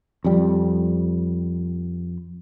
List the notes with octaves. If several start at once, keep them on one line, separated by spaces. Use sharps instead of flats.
F2 G3